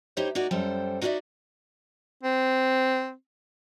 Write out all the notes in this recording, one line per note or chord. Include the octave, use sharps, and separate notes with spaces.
D#4 E4 G4 C5 C#5
A#3 D#4 F#4 D5
F#2 G3 A4 C5 G5
D#4 F#4 A#4 C#5 D5 E5
C4